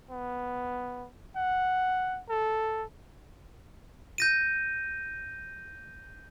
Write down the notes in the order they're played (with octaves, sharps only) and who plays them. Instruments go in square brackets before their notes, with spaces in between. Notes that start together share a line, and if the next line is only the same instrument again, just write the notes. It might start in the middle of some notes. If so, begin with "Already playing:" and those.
[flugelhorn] B3
F#5
A4
[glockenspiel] G6 A#6 D#7